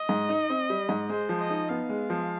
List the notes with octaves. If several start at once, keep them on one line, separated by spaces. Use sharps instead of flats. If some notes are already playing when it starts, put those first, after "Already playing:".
Already playing: D#5
G#2
D#4
C4
G3
G#2
G#3 C5
F3
D#5
D#4
B3 F5
G#3
F3